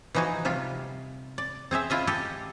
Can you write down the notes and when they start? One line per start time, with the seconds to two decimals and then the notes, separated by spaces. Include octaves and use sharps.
0.15 E3 F3 D#4 F#4 G#4
0.45 C3 G3 F4
1.38 D5
1.71 C4 G#4 C5 E5
1.90 E4 F4 D#5 E5
2.07 G4 A4 D#5